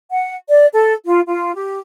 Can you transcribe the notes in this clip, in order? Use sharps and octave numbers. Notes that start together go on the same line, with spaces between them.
F#5
D5
A4
F4
F4
G4